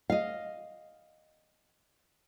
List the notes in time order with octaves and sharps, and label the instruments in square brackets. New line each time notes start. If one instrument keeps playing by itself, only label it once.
[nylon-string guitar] D#5 F5